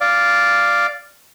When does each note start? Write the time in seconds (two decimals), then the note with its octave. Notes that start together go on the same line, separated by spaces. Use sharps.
0.01 D5 F5